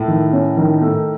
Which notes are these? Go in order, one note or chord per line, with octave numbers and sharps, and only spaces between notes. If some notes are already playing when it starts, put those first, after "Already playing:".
Already playing: A2 A3
D#3
C#4
D#3
A3